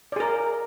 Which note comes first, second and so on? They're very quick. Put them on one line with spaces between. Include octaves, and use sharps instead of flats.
D5 G#4 A#4